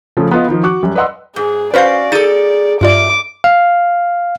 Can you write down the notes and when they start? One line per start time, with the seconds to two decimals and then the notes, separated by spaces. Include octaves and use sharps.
0.17 C#3 F3 A3 A4
0.31 B3 F4 D#5
0.48 D#3 F3
0.63 F#4 C#6 D6 F#6
0.83 F#2 G3
0.95 B4 D5 D#5 F#5 C6 E6
1.36 G#2 G#4
1.74 C#4 F#4 B4 C5 D5 F5 G6
2.12 D#4 G#4 A4 A6 D#7
2.81 G2 F4 D5 E5 D6
3.44 F5